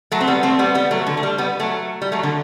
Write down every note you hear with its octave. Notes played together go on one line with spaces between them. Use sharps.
F#3 A3
C4
G3 B3
A3 C4
G3 B3
G3 B3
F#3 A3
D3
A3
G3
G3 B3
F#3 A3
G3
F#3 A3
D3